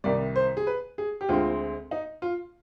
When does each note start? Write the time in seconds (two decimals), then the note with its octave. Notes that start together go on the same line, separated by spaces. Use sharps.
0.04 C2 C3 D#3 G3 D5
0.36 C5
0.57 G#4
0.67 B4
0.98 G#4
1.21 G4
1.29 D2 D3 G#3 C4 F4
1.91 D#4
2.22 F4